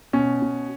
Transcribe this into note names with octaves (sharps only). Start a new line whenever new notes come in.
B2 C#4
B2